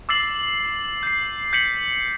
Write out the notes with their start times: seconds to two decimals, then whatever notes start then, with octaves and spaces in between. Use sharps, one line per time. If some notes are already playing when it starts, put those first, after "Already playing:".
0.09 D6 E6 A6 C7 F#7
1.03 G6 C7
1.53 G6 B6 C#7 F#7